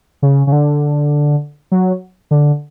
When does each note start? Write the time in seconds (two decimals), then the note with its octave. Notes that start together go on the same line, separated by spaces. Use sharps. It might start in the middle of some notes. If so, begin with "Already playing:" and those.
0.22 C#3
0.47 C#3
0.52 D3
1.72 F#3
2.31 D3